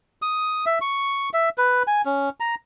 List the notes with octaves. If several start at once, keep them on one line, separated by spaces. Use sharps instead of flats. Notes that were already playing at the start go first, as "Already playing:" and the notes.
D#6
E5
C#6
E5
B4
G#5
C#4
A#5